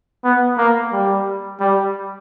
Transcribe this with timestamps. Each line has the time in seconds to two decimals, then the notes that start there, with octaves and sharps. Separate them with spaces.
0.24 B3
0.58 A#3
0.92 G3
1.60 G3